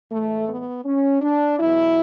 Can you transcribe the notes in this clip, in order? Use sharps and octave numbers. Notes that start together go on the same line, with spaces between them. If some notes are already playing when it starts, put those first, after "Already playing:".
A2 E3 G#3 A3
B3
C#4
D4
E2 B2 F#3 E4